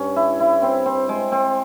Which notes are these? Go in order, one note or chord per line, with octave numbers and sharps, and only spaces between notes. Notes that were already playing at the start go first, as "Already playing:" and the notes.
Already playing: G2 C#4
E4
E4
C4
C4
G#3
C4